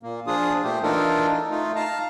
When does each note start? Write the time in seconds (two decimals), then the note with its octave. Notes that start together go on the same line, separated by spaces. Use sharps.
0.03 A#2 A#3
0.27 F3 D4 F4 G#4 D#6
0.63 A#2 A3 G4 C5
0.83 E3 D4 D#4 F4 A4 A#4
1.50 A3 D#4 F4
1.76 F5 A5 A#5